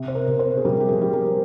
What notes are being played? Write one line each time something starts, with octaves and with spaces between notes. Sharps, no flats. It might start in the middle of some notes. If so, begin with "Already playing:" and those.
Already playing: C3
C5
A#4
C3
C5
G#4
G3 A#4
G4
G#4
G3
A#4